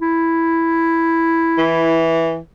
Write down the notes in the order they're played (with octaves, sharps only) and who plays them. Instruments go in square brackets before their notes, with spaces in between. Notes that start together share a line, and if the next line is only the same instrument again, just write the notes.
[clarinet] E4
[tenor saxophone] E3